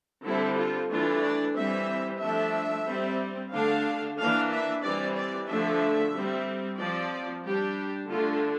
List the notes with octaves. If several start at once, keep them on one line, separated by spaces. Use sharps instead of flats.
D3 G3 C4 E4
F4
E3 A3 D4 F4
D5
E3 G3 C4 E5
F3 A3 D4 E5
G3 C4
D3 A3 D4 F5
E3 A#3 D4 F5
E5
E3 G3 C4 D5
D5
D3 F3 A3 D4 E5
G3 C4
F3 C4 D5
G3 D4 G4
D3 A3 D4 F4